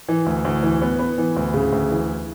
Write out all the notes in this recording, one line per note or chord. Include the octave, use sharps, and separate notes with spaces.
E3
D2
D2
E3
B3
B3
E3
D2
C#3
D2
E3